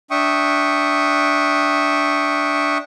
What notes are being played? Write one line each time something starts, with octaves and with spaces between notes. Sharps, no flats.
D4 E5 G5 C#6 D#6